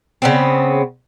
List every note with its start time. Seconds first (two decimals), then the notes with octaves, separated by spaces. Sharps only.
0.22 C#3 B3 C4